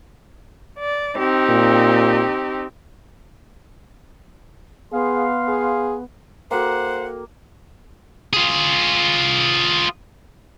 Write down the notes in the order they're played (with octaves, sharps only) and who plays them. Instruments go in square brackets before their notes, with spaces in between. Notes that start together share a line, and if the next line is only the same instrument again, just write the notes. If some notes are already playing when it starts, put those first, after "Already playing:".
[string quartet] D5
C4 D#4 G4
[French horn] A#2
[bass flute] B3 [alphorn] G#4 [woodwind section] F5 C6
[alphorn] G#4
[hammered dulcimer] A#3 [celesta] F#4 A4 G5 [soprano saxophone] C5 [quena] F#5
[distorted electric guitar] F4 G#4